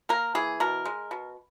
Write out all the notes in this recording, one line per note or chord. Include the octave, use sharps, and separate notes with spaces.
A#3 A#4
E3 G#4
B2 A#4
G#3
B2